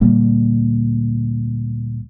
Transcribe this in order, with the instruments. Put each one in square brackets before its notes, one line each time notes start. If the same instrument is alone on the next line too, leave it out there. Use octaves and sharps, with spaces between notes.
[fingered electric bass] D2 A#2 G3 A#3